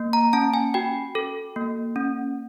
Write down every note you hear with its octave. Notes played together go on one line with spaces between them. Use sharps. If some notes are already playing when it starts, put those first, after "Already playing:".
Already playing: A#3
A#5
C#4 A5
G#5
F#4 G5
A4
A#3
C#4